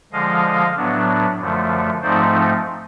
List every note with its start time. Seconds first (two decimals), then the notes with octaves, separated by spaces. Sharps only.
0.12 D3 F3 G#3 D#5 F5
0.76 A2 F#3 B3 D4
1.39 F#2 D3 F3 A3
2.02 G#2 F3 A3 C4 D#4 C5 D5